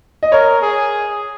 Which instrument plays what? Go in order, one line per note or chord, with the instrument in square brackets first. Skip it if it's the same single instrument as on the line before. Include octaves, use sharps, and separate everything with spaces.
[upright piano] D#5
[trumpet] A#4 [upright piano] C#5
[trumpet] G#4